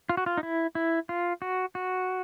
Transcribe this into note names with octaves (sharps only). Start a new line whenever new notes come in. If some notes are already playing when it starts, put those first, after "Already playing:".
F4
F#4
F4
D#4
E4
E4
F4
F#4
F#4